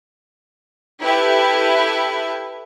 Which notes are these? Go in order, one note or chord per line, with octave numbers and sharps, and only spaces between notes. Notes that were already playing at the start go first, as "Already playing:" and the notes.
E4 G4 A4 B4 E5